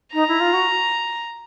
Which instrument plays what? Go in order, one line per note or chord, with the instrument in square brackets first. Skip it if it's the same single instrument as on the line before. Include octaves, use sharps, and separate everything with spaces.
[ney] D#4 [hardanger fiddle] A#5
[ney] E4
F4
F#4